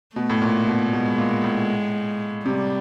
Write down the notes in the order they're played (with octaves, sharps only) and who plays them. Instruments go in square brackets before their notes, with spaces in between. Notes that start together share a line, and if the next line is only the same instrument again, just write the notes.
[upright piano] B2 [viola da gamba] A3
[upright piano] A2
A#2
B2
[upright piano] B2 [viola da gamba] G#3
[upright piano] A#2
A2
[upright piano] C3 [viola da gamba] G3